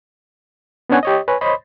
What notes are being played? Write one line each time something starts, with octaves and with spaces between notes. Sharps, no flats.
B3 C#4 D4 C#5 F#5 G#5
G4 C#5 D#5
B4 C#5 G#5
C5 C#5 D#5 B5 C6